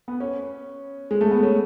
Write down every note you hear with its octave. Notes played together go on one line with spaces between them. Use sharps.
B3
C#4
G#3
A3
B3
C#4